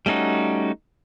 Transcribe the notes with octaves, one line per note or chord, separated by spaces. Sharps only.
G3 A3 C#4 D#4 F#4